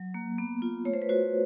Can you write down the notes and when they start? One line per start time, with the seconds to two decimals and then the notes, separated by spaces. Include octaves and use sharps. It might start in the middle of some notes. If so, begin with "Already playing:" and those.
Already playing: F#3
0.14 A#3
0.38 B3
0.62 F4
0.85 A3 C#5
0.94 C5
1.02 B4
1.09 F#4 C5